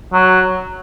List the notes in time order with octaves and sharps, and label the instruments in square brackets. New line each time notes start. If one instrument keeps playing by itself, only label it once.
[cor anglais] F#3